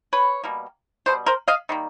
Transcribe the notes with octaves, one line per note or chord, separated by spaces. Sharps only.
B4 C#5
B2 G3 A#3
B2 G3 C5
A#4 C5
D#5 F5
D#3 G3 A#3